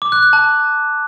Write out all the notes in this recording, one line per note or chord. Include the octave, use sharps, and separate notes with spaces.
D6
F#6
F#6
A5